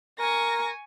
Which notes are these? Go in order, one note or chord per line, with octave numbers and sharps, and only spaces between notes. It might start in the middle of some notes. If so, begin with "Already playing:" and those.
A#4 G#5 C#6 A#6